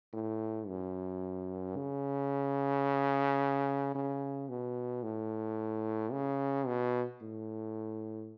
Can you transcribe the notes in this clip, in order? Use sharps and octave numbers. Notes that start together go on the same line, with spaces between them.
A2
F#2
C#3
C#3
B2
A2
C#3
B2
A2